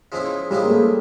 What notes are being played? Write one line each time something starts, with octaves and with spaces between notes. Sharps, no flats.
C#3 F3 G#3 B3 E4
C#3 F3 G3 G#3 B3 E4
A#3
A3